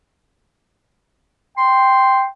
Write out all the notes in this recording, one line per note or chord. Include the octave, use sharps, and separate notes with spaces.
G5 C6